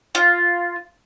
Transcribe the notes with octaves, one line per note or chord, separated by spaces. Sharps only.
F4